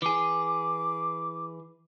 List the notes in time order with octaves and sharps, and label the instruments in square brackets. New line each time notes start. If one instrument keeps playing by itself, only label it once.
[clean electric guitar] E3 G#4 [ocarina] D6